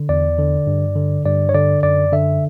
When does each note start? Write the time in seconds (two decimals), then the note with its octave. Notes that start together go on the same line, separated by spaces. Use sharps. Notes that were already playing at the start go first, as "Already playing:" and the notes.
Already playing: D3
0.09 E2 D5
0.38 D3
0.67 G2
0.96 D3
1.25 G2 D5
1.49 C#5
1.54 D3 D5
1.83 F#2 D5
2.12 D3 E5